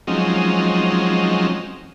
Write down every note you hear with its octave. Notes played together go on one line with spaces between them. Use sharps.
F3 F#3 G#3 C4 C#4 D#4